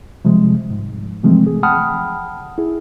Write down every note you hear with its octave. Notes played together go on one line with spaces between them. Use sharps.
C3 F3 G3 G#3
G#2
C3 E3 F3 G#3 A3 C4
G#4
F#5 G5 A5 B5 D#6 F6
E4 G#4